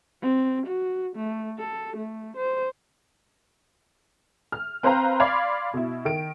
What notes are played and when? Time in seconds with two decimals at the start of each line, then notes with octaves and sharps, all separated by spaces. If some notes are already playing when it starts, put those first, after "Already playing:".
0.22 C4
0.66 F#4
1.16 A3
1.59 A4
1.97 A3
2.37 C5
4.52 F6
4.83 C4 B4 C5 F5 A#5
5.20 D5 F5 B5 C6 G#6 F7
5.74 B2 E4
6.05 D#3 D7